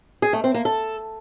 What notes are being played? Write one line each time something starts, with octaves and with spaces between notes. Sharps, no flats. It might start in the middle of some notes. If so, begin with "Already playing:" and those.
G#4
A3
C4
A#3
A4